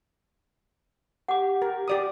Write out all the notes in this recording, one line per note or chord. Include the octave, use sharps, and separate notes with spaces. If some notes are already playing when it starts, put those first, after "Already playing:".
G4 F#5 D6
A#4
G4 D5 D#6